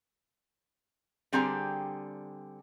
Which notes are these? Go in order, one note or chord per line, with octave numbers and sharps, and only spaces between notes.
D3 G3 C4 G4 G#4 A#5